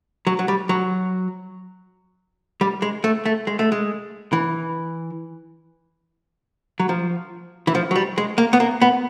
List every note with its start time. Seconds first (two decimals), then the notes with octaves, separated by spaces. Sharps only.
0.27 F#3
0.39 F#3
0.48 G3
0.69 F#3
2.61 G3
2.82 G#3
3.04 A3
3.26 A3
3.47 G#3
3.59 A3
3.72 G#3
4.33 E3
6.80 F#3
6.89 F3
7.67 E3
7.75 F3
7.91 F#3
7.96 G3
8.18 G#3
8.38 A#3
8.53 B3
8.60 A#3
8.82 B3